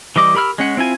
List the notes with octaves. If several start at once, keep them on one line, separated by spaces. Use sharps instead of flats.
E3 G3 D#5 D6
G4 A#4 B5 E6 F6
G#3 C#4 F#5
C4 E4 F4 G#5